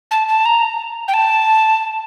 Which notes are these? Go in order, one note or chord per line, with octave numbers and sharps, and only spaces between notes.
A5
A5
A#5
G5
A5